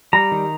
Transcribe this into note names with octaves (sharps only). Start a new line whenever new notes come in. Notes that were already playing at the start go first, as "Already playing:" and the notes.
G3 A#5
D#3